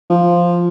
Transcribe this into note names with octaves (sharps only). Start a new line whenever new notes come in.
F3